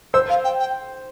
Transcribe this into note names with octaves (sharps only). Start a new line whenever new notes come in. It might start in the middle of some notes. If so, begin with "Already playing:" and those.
C5 E6
F5
G5
G5